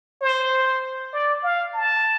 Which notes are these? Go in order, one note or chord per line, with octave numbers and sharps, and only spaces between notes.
C5
D5
F5
A5